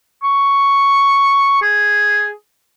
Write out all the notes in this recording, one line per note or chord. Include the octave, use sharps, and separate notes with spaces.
C#6
G#4